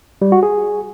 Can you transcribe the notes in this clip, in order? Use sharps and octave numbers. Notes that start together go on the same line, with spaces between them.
G3
F#4
G#4